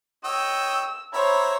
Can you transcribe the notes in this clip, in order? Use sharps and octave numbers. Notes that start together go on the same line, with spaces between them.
C#5 D#5 G5 E6
C5 C#5 E5 A#5 B5